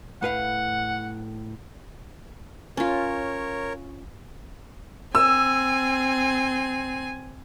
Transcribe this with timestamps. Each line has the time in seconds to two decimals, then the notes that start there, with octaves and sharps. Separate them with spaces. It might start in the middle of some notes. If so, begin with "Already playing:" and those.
0.23 A2 B4 F5 F#5
2.77 C#4 F4 A#4 C#5
5.15 C4 G#5 E6